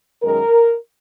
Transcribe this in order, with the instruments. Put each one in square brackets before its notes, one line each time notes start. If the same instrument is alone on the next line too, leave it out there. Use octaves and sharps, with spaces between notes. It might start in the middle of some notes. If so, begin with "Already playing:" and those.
[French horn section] F#2 D#3 G#3 A#4